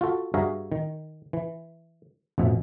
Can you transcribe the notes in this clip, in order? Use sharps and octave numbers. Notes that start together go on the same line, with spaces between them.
F4 F#4 A4
G2 F#4 G#4 E5 F5 A#5
D#3
E3
A1 F2 B2 E5